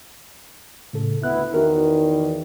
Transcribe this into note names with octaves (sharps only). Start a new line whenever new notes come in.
A2 C#3 A4
D2 B3 E4 F#6
E2 D#3 E3 D#4 F#4 A#4